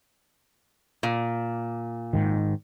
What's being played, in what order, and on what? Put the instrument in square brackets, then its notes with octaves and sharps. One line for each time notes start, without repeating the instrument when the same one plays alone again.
[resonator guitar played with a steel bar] A#2
[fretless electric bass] G#2 D#3